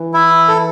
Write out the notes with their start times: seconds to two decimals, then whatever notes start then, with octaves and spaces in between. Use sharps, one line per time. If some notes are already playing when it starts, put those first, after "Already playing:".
Already playing: E3
0.14 E4
0.48 A4